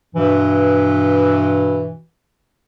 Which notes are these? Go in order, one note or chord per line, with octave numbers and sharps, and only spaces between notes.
G2 B2 E3